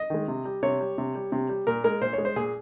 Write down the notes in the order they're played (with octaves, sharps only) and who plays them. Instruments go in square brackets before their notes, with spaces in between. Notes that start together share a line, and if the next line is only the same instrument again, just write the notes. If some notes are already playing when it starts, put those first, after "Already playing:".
Already playing: [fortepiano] D#5
D#3 G#3
C3
G3
C3 C#5
G3
C3
G3
C3
G3
A#2 A#4
G#3 A#4
A#2 C5
G#3 C#5
C5
A#2 G#4